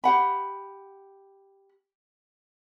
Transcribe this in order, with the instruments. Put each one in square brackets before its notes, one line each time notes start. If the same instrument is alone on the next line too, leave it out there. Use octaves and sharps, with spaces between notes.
[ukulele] G4 F#5 B5